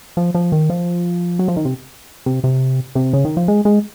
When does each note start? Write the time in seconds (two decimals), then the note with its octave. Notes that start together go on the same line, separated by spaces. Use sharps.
0.17 F3
0.35 F3
0.52 D#3
0.70 F3
1.39 F#3
1.48 F3
1.57 D#3
1.65 C3
2.26 C3
2.44 C3
2.95 C3
3.13 C#3
3.25 D#3
3.37 F3
3.48 G#3
3.65 G#3